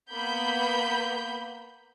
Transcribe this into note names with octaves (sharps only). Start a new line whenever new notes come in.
A#3 B3 B5 G6